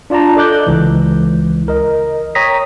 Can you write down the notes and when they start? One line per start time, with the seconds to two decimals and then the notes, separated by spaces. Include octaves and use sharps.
0.10 D4 F4 D5 A5 A#5
0.36 A4 D#5 D6 F#6 G6
0.66 C#2 E3
1.68 A#4 D#5
2.35 C#5 G5 A#5 D#6 A#6 B6